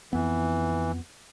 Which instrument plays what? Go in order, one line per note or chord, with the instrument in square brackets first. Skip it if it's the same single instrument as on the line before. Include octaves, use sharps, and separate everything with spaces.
[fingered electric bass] F2 B3 [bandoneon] E3